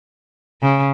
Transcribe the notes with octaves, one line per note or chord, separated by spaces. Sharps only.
C#3